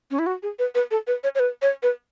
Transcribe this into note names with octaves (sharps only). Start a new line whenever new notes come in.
C#4
E4
F#4
G#4
B4
B4
A4
B4
C#5
C#5
B4
C#5
B4